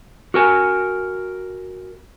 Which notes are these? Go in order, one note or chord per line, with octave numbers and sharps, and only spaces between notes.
F#4 A#4 G#5